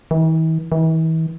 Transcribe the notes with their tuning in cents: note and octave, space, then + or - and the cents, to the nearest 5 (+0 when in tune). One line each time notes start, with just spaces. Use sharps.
E3 -45
E3 -40